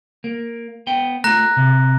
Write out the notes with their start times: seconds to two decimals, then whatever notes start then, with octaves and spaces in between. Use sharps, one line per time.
0.24 A#3
0.87 B3 G5
1.24 A3 F4 A#5 F#6 A#6
1.57 C3